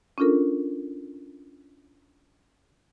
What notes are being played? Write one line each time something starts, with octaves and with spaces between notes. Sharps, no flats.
C#4 D4 F4 A4 A#4